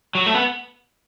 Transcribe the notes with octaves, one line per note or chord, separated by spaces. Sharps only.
F#3
A3
B3